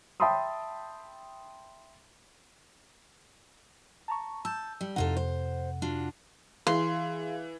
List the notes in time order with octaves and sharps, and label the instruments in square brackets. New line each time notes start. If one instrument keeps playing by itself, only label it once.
[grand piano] E5 G5 A5 B5 C6 D#6
[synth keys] A5 A#5 C#6
[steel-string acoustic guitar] A5 [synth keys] E6 G6
[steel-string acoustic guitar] G3
[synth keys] F2 C3 F#5 [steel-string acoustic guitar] D#4 F4 A4
[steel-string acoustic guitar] C5
D4 F4 F#4
[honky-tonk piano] E3 [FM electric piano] G#4 F5 [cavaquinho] C6